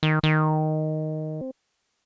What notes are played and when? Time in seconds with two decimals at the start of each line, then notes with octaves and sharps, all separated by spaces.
0.03 D#3
0.23 D#3
1.41 C4